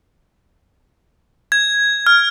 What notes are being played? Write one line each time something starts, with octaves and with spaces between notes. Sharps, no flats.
G#6
F6